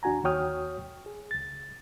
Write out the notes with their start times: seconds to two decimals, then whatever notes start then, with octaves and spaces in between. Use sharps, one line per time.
0.03 D#2 D4 F#4 G#5 A#5
0.24 D#2 F#4 C#5 G5 D#6 F6
1.06 G#4
1.31 C#2 A6